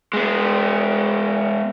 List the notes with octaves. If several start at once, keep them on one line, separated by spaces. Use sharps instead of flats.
G#3 B3